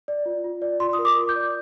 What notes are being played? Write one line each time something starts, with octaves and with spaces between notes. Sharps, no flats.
D5
F4
F4
D5
F4 C6
D#6
A#4
D6
F4
G6
D5